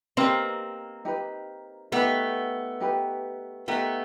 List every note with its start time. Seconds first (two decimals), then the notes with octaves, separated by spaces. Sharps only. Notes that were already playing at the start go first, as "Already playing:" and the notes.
0.17 A#3 C4 D#4 G4 B4
1.05 D#4 G4 B4
1.92 A3 B3 D#4 G4 B4
2.80 D#4 G4 B4
3.68 A3 B3 D#4 G4 A#4